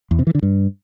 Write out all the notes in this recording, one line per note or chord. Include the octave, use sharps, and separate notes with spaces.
E2
C3
E3
D3
G2